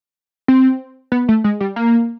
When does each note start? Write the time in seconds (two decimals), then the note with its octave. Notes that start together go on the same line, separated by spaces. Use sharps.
0.48 C4
1.12 B3
1.29 A3
1.44 G#3
1.60 G3
1.76 A#3